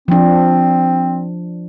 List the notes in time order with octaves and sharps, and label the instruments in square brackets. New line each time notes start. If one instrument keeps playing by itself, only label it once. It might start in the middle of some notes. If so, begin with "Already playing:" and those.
[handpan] F3 D4 [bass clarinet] C4